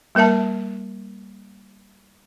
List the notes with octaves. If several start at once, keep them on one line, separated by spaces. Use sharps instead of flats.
G3 A#3 A#4 E5 A5